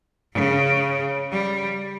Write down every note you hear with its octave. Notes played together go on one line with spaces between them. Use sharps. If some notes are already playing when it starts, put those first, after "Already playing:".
C#3
G3